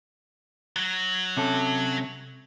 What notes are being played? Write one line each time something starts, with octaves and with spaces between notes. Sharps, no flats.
F#3 F#4
C3 C#4 A4